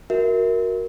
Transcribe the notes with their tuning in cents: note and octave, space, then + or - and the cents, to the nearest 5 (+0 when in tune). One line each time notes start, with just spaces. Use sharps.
F#4 +0 A#4 +0 E5 -20